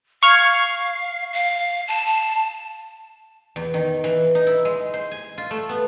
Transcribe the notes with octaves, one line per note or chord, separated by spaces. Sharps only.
F5 C#6 F6 G#6
F5
A5
A5
E2
D#3
E3
D#4
E4
G#3
C5
G#5
F4
A3
B3